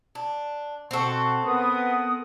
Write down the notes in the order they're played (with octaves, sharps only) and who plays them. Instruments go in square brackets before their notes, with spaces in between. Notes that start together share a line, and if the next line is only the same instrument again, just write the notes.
[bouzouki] D4
[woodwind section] B2 F#5 C#6 [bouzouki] C4 A4
[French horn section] B3 [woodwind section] A#4 F#5 D#6